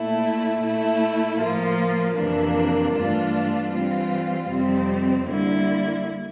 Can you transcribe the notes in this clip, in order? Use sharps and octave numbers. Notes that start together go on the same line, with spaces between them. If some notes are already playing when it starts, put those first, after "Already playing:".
Already playing: A#2 A3 E4
A#2 A3 E4
A2 F3 A#3 F4
F2 C3 E3 A#3 D4
G2 E3 A3 D4 F4
E3 G3 C4 F4
F2 C3 G3 C4
D3 G3 A#3 E4